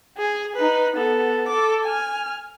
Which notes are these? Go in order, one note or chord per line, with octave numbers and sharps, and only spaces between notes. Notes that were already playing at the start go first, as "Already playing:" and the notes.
G#4
D#4 B4
B3 A4
A4 D6
G#5 F6